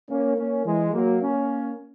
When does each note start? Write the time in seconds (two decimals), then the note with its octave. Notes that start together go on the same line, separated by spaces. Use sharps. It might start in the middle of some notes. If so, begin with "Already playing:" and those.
0.09 A#3 C#4
0.37 A#3 C#4
0.65 E3 G#3
0.93 F#3 A#3
1.22 A#3 C#4